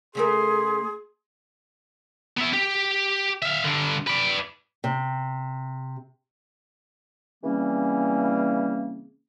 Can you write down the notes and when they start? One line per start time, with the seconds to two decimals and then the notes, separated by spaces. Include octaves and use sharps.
0.15 C#3 A3 G#4 A#4 C6
2.37 B3 E5
2.53 G4
3.42 E5 F5
3.64 G2 D3
4.07 B4 D5
4.84 C3
7.44 C#3 E3 G3 A#3 C4 C#4